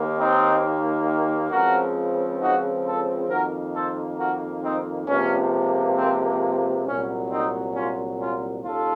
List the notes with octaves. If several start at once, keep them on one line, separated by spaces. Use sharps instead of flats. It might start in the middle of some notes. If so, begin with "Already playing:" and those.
Already playing: D#2 D#3 A#3
C4 D#4
C#2 C#3 F3 C4 F#4 A#4
D#4 F#4
F4 A4
F2 D#3 A#3 F#4 A#4
A4 C5
F#4 A#4
C4 D#4
C#2 C3 F3 A#3 C#4
C4
C2 A#2 F#3 C#4
C4 D#4
C#4 F4
C#4 F4
D#2 C#3 F4 A4